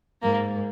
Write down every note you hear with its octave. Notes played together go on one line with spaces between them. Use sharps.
G#2 A#3